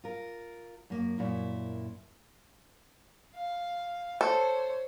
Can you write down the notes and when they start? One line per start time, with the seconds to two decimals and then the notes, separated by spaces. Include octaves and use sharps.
0.04 F4 A#4
0.90 F#2 A#3
1.18 F#2 A#2 E4
3.36 F5
4.21 A4 C5 C#5